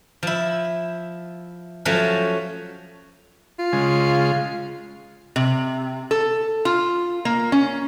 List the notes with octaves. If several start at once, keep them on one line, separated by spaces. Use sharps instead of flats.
F3 E4
F3 F#3 A3 C#4
F4
C#3 G#3
C3
A4
F4
A#3
C#4